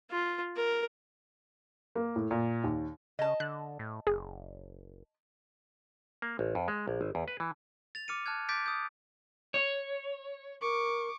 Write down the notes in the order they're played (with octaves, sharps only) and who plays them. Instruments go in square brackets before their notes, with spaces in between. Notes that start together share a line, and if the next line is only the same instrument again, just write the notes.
[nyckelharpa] F4
A#4
[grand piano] A#3
A2
A#2
D#2
[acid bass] C#3 [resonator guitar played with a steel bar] D#5 A5
[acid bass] D3 [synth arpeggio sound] F#6
[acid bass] A2
[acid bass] F#1 [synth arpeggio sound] G#4
[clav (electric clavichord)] A#3
A1
F2
G#3
A#1
G#1
E2
B4
E3
[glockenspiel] A6 F7
D6 F6 C#7 D#7
A5 F6 F#6 G#6
D6 G6 A6 B6 D7
D#6 G6
[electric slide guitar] C#5
[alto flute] A#4 [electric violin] C#6 D6